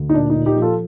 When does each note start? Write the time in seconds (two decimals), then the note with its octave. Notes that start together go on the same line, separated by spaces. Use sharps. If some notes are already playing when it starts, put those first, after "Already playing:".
Already playing: D2
0.09 D#4
0.14 A#2 D4
0.30 D#4
0.35 A#2
0.46 D#4 G4
0.56 F3
0.62 F4 A4